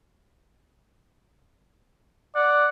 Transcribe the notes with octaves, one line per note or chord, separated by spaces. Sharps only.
D5 F#5